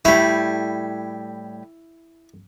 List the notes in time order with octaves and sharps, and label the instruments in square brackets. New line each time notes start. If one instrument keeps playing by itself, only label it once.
[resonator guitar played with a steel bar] A2 G3 [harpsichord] E4